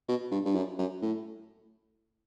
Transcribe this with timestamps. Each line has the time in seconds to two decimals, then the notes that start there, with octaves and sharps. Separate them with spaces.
0.08 B2
0.31 G2
0.45 G2
0.55 F#2
0.79 F#2
1.02 A2